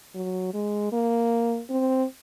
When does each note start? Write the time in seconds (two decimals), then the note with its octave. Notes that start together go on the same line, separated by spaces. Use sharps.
0.15 F#3
0.54 G#3
0.92 A#3
1.70 C4